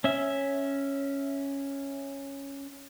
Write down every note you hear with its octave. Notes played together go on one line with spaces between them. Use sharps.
C#4 E5